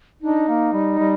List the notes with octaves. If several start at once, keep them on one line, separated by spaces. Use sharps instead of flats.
D4 D#4
A#3
G3
G3